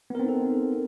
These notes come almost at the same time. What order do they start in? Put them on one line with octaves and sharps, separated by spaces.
B3 A#4 C4 D#4 A4